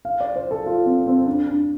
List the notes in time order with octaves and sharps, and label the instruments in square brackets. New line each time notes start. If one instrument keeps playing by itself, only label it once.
[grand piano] F5
D5
C5
A4
F4
C4
C4
D4
D4